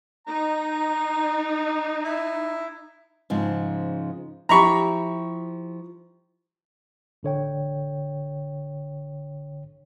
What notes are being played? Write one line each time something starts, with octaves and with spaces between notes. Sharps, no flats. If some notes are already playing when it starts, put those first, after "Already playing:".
D#4 A#5
E4
G#2 C#3 F3
F3 E4 G4 A#5 B5 C#6
A1 D3 C#5 G5